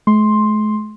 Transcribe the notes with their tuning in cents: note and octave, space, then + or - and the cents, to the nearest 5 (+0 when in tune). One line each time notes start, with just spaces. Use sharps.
G#3 +45 C6 +5